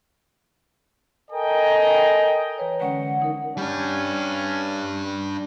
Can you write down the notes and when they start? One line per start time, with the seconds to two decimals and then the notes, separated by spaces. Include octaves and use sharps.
1.31 A4 A#4 D#5 G5 G#5 A#5
2.58 E3 B4 C#5
2.80 D3 G#3 C#4 F#5
3.20 E3 D#4 A#4
3.58 G3 C#4 D4